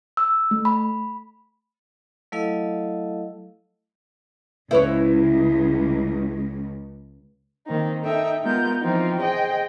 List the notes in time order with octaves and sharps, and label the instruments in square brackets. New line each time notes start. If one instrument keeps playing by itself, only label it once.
[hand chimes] E6
A3
B5
[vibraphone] F#3 A3 E4 A4 D#5 F5
[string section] C#2 [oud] E4 B4 C#5
[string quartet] D#3 A#3 C4 D#4
D#4 A4 E5 G5
G#3 B3 F4 A#4 G6
E3 F3 C4 D#4 F4
G#4 C5 D#5 G5